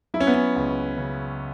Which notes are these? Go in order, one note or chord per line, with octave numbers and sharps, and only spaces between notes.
F#3 E4
C#4
B3
C#4
C#2
C#3